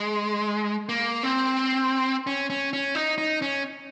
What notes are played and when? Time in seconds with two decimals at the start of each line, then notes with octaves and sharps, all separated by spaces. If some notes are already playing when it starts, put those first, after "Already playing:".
Already playing: G#3
0.89 A#3
1.23 C4
2.27 C#4
2.50 C#4
2.73 C#4
2.95 D#4
3.18 D#4
3.42 C#4